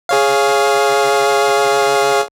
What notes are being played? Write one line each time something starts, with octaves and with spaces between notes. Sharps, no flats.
G#4 C#5 F5